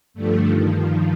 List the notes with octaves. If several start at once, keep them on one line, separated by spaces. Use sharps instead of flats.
G2 D3 F3 A3
G2 D#3 F3